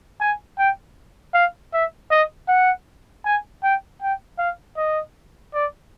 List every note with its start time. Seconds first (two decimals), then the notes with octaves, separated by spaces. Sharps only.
0.21 G#5
0.58 G5
1.34 F5
1.73 E5
2.11 D#5
2.48 F#5
3.25 G#5
3.63 G5
4.02 G5
4.39 F5
4.77 D#5
5.54 D5